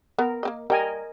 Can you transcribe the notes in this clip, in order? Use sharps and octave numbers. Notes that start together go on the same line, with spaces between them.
B3 A#4
A#3 C4 D#5
G3 A#4 D#5 G5 G#5